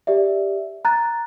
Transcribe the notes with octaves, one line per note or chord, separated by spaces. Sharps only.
G4 D5 E5
A#5 F#6 A6